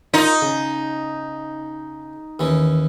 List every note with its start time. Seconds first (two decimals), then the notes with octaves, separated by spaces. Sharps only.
0.14 D#4 F4 A#4 A5
0.42 C#3
2.39 D#2 E3 C#4